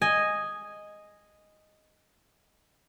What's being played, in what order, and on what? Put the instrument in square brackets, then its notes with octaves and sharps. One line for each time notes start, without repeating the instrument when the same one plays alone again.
[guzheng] D#5 G#5